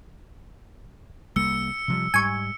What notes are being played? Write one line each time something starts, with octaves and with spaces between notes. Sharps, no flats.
C2 G3 A#3 E6 C#7
C3 F3 G3
G#2 G3 G#5 C#6